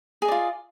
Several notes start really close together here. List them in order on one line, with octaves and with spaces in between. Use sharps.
G#4 D#5 D5 F4